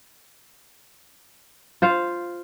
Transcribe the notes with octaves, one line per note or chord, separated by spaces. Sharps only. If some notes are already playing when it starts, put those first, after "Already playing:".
F4 C5 F5